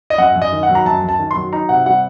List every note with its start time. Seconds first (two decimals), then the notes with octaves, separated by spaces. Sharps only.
0.10 D#5
0.18 F#2 F#5
0.36 F#2
0.42 D#5
0.52 D#3
0.63 F#5
0.70 F#3
0.75 A#5
0.86 F#2 A5
1.03 F#2
1.09 A5
1.19 D#3
1.31 C6
1.36 F#3
1.53 D#4 A#5
1.69 C3 F#5
1.86 G3 F#5